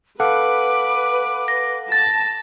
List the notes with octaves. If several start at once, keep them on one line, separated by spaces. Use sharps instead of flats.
A4 B4 F5 F#5 D6
A#6
A5 A6